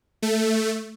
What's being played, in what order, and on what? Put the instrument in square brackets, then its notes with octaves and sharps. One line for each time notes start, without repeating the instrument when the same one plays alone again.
[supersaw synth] A3